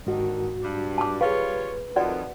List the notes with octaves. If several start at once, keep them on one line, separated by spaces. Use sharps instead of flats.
D#2 G#2 D3 D#3 F#4
G2 D4
A5 D6
G3 F4 G#4 B4 C#5 F5
F2 D#3 F#4 D5 F#5